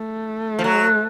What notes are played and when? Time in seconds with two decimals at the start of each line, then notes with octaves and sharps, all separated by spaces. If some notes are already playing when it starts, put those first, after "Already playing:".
Already playing: A3
0.59 F3
0.64 F#3